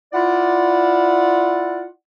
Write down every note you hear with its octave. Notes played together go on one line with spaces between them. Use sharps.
E4 F4 D5 F#5